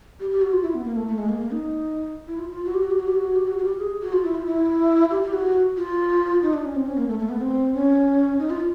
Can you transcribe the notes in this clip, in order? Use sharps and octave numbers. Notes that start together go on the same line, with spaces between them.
G4
G4
F#4
F4
E4
B3
A#3
A3
A3
G#3
A#3
A#3
D#4
E4
F4
F4
F#4
G4
F#4
G4
F#4
G4
F#4
G4
F#4
F#4
G4
G#4
F#4
F4
E4
F4
E4
G4
G4
F#4
F4
D#4
D4
C#4
C4
C#4
A#3
A3
A3
B3
C4
C#4
D#4
F4